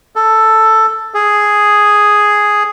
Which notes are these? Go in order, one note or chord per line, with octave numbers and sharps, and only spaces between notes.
A4
G#4